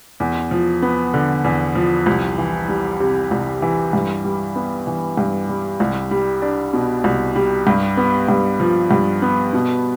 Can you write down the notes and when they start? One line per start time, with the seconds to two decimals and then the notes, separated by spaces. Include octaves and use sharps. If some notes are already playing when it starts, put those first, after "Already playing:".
0.20 E2
0.51 F3
0.82 B3
1.14 D3
1.44 E2
1.75 F3
2.06 C2
2.38 E3
2.68 G3
3.00 C3
3.31 C2
3.62 E3
3.93 G2
4.24 G3
4.56 B3
4.87 E3
5.17 G2
5.49 G3
5.80 C2
6.11 G3
6.42 D4
6.73 B2
7.04 C2
7.35 G3
7.67 G2
7.97 B3
8.29 G2
8.60 F3
8.91 G2
9.22 B3
9.53 B2